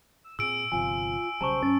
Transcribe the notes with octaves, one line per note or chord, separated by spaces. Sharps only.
E6
A#2 C4 G#4 E6 D7
G1 C3 F3 F4 G#5
B1 C#3 G3 C5 A5 A#5 C#6
F#2 C#4 A6